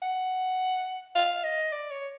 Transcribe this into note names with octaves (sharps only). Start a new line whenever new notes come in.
F#5
F5
D#5
D5
C#5